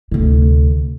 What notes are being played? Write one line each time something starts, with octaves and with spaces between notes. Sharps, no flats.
D2 C3